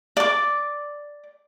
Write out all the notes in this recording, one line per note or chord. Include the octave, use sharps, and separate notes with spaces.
D5 D6